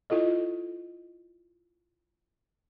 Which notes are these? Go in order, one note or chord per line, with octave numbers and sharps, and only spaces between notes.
E4 F4 A4 D#5